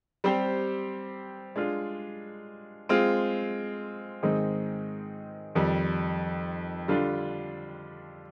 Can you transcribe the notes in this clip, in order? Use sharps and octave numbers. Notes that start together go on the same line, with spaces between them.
G3 C4 G4 C5
G#3 D4 F4
G#3 C4 F4
G#2 D#3 G#3 C4 D#4
F2 D#3 G3
D3 G3 D4 F4